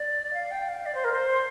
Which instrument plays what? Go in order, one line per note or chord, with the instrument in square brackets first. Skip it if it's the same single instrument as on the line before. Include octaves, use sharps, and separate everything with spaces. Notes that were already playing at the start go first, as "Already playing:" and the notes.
Already playing: [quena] D5
F5
G5
F5
D5
C5
A#4
C5